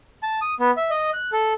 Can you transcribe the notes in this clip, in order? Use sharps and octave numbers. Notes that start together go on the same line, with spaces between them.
A5
D#6
B3
E5
D#5
F#6
A4